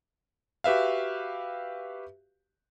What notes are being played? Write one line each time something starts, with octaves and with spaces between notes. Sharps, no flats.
F#4 G4 B4 E5 F5